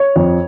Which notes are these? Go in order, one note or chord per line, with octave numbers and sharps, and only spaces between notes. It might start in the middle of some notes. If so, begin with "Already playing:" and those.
Already playing: C#5
F2